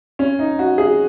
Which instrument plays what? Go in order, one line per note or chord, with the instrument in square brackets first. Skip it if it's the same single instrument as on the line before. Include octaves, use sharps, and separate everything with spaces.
[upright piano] C#4
D#4
F#4
G#4